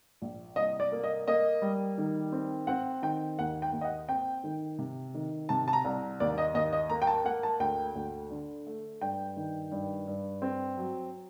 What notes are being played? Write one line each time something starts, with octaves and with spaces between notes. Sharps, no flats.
A#1
C2 D#5
D5
A#3
D#5
A#3 D#5
G3
D#3
C4
C4 F#5
D#3 G5
D#2 F#5
G5
D#2
D#5
F#5
C4 G5
D#3
C3
D#3
C3 A5
A5
A#5
C2
D#2 D5
D#5
D#2 D#5
D#5
A#3 A#5
G5
A5
A#3 F#5
A5
D2 G5
D2
D3
A3
G2 G5
D#3
G2
G2
C4
F#3